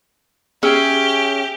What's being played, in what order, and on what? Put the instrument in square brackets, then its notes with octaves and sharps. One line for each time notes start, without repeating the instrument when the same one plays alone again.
[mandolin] C#4 G#4 E5 [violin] G4